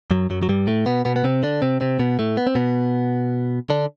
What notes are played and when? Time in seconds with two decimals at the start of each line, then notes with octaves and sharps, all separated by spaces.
0.11 F#2 F#3
0.30 F#2 F#3
0.43 F#3
0.49 G2 G3
0.67 A2 A3
0.86 B2 B3
1.05 B2 B3
1.16 B3
1.24 C3 C4
1.43 D3 D4
1.62 C3 C4
1.81 C3 C4
1.99 B2 B3
2.19 A2 A3
2.37 B3
2.47 C4
2.55 B2 B3
3.70 D3 D4